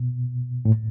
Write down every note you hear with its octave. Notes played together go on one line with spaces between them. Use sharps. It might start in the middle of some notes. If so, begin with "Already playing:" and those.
Already playing: B2
A2